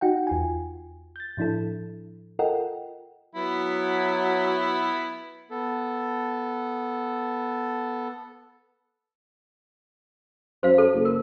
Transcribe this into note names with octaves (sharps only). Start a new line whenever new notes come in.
D#4 F#4 F#5 G5
E2 F4 G#5
G6 A6
A2 F3 D4 E4 A4
F4 A4 A#4 D#5 F#5 G5
F#3 B3 E4
B3 A4
F#2 C5 F5
A4
F#1
A#4